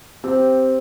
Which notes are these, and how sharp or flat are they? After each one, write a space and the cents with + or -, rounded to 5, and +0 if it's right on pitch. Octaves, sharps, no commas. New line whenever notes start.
C4 +0 G4 -5